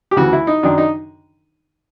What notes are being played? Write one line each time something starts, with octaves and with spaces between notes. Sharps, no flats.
G4
D2 C#3 E3 F#4
E4
D#4
F#2 D#3 D4
D#4